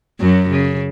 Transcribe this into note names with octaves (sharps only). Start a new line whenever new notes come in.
F#2 F#3
C#3